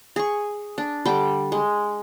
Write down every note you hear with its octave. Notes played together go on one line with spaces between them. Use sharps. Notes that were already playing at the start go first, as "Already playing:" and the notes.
G#4 C#6
D4
D3 G3 G5 D6
G#3